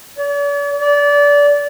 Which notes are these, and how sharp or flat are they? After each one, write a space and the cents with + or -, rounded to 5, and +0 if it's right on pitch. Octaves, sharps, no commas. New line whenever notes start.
D5 -45
D5 -25